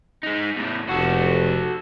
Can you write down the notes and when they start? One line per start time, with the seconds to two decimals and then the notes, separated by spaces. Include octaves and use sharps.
0.23 G#3 D#4
0.57 E2 A2
0.89 F1 F#4 A4